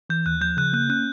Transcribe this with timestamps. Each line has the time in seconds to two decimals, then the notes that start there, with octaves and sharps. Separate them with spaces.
0.10 E3 G6
0.26 D#2 F#6
0.41 F3 G6
0.57 C#3 F#6
0.73 A#3 F#6
0.89 C#4 F#6